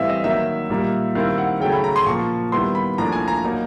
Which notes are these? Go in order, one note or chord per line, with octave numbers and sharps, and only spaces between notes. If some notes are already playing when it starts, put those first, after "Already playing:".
Already playing: A2 E3 G3 C4 E5 F5
D#5
D#3 F#3 A#3 D#4 E5
A#2 G3 A#3 D#4
D#3 G3 C4 E4 F5
F#5
C#3 F#3 A3 C#4 G5
B5
A#5
C6
A#2 F3 A#3 C#6
D#3 G3 B3 E4 C6
B5
A2 F3 A#3 D4 A#5
G#5
A#5
F#3 A#3 D#4